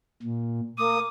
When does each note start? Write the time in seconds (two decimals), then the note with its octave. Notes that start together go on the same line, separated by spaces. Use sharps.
0.23 A#2
0.78 A#3 D6 D#6